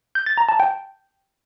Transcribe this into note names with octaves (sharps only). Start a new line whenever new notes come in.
G6
A6
A#5
A5
G5